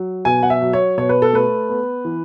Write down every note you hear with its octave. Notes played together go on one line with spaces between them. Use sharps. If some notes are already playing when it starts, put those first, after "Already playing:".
Already playing: F#3
B2 G#5
F#5
E5
F#3
C#5
B2 C#5
B4
A4
A3 B4
B3
E3